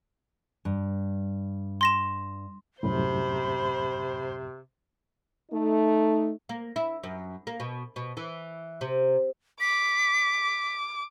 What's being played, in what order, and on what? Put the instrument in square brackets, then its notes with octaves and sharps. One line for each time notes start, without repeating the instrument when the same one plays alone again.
[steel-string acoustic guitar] G2
[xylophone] C6 A#6 E7
[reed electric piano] C2 F#2 A2 [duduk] C3 [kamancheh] C5 [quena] B5
[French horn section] A3 D#4
[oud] A#3
E4
F#2
A#3
B2
B2
E3
C3
[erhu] D6 [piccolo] B6